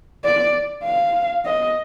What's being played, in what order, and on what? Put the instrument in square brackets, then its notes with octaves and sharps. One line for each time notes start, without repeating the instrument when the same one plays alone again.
[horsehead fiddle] D5
F5
D#5